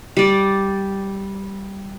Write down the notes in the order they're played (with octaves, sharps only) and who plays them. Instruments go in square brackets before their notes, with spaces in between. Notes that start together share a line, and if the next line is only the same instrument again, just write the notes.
[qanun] G3 D5